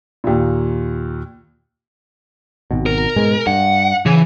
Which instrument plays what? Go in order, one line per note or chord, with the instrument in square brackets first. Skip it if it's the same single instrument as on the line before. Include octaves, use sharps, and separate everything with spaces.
[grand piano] D#2 A#2
[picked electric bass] G#1 B2
[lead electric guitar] A#4
[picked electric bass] G#2 B2 G#3
[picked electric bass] G2 [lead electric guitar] F#5
[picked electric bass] C#3 [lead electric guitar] E3